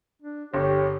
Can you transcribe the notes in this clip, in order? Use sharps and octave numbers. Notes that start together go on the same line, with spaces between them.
D4
G1 G4 C#5